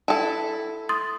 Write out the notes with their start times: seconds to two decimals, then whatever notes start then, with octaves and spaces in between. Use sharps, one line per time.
0.08 E4 A4 A5
0.89 C6 D#6 A6